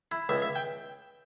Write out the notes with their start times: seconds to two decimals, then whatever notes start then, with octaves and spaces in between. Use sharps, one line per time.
0.12 E4
0.29 C#2 E5
0.42 E5
0.56 G5